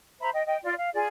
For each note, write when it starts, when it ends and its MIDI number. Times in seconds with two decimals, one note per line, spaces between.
0.21 0.29 72
0.21 0.29 76
0.21 0.29 82
0.21 0.29 83
0.34 0.45 75
0.34 0.45 79
0.46 0.57 75
0.46 0.57 79
0.63 0.73 65
0.63 0.73 74
0.77 0.88 77
0.94 1.08 65
0.94 1.08 68
0.94 1.08 74